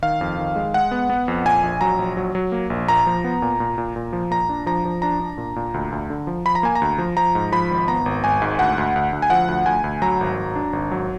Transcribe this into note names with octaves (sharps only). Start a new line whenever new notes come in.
D#3 F5
F2
D#3
G#3
G#3 F#5
B3
B3
F2
A#2 G#5
A#1
F#3 A#5
A#1
F#3
F#3
A#3
A#1
A#2 A#5
F3
B3
A#2
A#2
A#2
A#2
F3
A#2 A#5
D4
F3 A#5
F3
D4 A#5
D4
A#2
A#2
D2
D2
D3
F3
F3 B5
A#5
A#3 G#5
A#5
D2
F3
F3 A#5
G#2
F3 B5
G#1
B3 A#5
G#1
G#1 G#5
G#2
D2 F#5
D2
D2
D2
G#5
F3 F#5
D2
D2 G#5
D2
F#3 A#5
G#1
F#3
D4
G#1
F#3